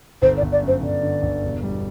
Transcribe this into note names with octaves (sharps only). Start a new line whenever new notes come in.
G1 C5
D5
G1
D5
F#2
C5
G1 D5
D3
G1
E1
G3